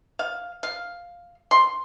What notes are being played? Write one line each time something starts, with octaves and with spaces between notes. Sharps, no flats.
F5
F5
C6